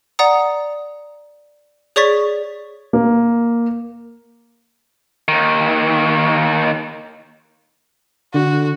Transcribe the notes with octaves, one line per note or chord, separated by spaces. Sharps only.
D5 F#5 A#5 D#6
G#4 C#5 D5 C#6 A6 B6
A#3
D#2 D#3
D3 F#4